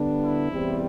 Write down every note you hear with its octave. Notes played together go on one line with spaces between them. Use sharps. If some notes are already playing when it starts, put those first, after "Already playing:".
Already playing: D3 G3 B3 D4
E4
E2 C3 G3 C4